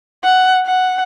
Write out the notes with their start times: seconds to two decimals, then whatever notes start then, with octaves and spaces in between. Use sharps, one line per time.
0.24 F#5
0.66 F#5